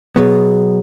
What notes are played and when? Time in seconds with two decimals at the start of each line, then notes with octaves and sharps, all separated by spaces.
0.16 B2 F#3 B3 G#4